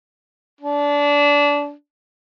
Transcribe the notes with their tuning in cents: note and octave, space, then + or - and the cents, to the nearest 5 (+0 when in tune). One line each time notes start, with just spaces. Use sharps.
D4 -25